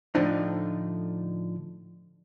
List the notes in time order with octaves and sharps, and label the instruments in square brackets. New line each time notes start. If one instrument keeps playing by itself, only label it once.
[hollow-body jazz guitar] A2 D3 F3 D4 D#4